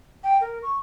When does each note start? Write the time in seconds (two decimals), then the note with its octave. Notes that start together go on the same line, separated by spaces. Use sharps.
0.24 G5
0.41 A#4
0.62 C#6